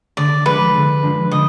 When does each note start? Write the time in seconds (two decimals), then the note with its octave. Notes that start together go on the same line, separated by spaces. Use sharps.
0.17 D3 D5
0.46 F3 G#3 D4 B4
0.75 D3
1.03 F3 G#3 D4
1.31 D3 D#5